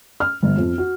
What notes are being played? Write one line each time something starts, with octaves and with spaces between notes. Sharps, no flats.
F6
G1
F2
F#4